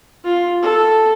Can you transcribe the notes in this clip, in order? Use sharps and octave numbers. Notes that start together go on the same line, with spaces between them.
F4
A4